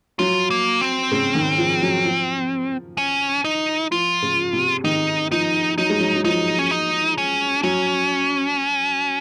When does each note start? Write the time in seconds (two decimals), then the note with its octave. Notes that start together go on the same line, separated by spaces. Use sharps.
0.19 F#3 F4
0.50 A#3
0.81 C4
1.12 C#3
1.35 D#3
1.58 F3
1.82 F#3
2.05 F3
2.98 C#4
3.44 D#4
3.91 F3 F4
4.22 C#3
4.53 C3
4.84 D#3 D#4
5.31 F3 D#4
5.78 F#3 D#4
5.90 G#3
6.00 F#3
6.16 F#3
6.25 F3 D#4
6.59 C#4
6.71 D#4
7.18 C#4
7.63 F#3 C#4